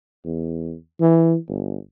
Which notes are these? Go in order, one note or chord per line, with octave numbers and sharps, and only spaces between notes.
E2
E3
G1